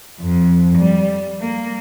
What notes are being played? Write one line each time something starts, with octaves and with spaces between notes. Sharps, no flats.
F2
G3
A#3